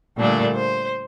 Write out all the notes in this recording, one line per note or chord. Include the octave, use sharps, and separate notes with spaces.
A#2 D3 G3 A3 A#3 D4
C5